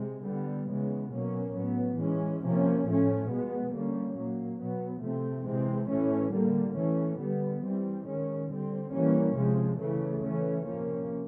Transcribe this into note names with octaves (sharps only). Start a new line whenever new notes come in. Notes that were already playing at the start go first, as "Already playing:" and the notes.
Already playing: C3 G#3
D3 G3 B3
C#3 E3 G#3 B3
B2 F#3 A#3 C#4
A2 F#3 B3
E3 G#3 C#4
C3 F3 A#3 C#4
A2 F3 A3 C#4
B2 G#3 B3
D3 G3 A#3 C#4
A#2 F#3 A#3
B2 F#3 B3
C3 F3 A3 C4
C3 E3 G#3 C4
A2 E3 A3 C#4
D3 G3 A#3
E3 A3 C#4
D3 G3 B3
E3 G3 C4
D#3 G#3 C#4
D3 G3 C4
E3 G3 A#3 C#4
C3 F3 G#3
C#3 E3 A3
E3 A3 C#4
C3 F3 A#3 C#4